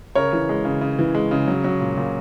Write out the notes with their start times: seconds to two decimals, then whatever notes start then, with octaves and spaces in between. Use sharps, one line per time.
0.15 C#3 A#4 C#5
0.33 E3
0.49 G#3
0.65 C#3
0.81 C#3
0.99 E3
1.15 G#3
1.31 C#3
1.48 F#3
1.64 F#3
1.81 A#2
1.97 A#2